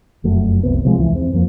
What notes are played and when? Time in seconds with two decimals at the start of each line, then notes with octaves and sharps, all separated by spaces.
0.24 F1 F#2 F#3 A3
0.63 F1 C2 B3
0.85 C3 F3 G#3
0.98 C#2 E3
1.12 E2 C4
1.33 F2 F3 A#3